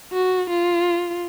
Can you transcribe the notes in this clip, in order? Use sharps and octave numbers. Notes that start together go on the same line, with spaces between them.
F#4
F4